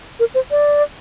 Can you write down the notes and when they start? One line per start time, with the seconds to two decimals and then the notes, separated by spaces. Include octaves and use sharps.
0.20 A#4
0.34 C5
0.51 D5